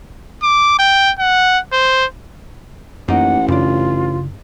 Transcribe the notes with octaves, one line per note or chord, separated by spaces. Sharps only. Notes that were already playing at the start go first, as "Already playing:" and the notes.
D6
G5
F#5
C5
A1 F#2 A#3 D#4 D#5 F#5
F#2 C#3 D4 F4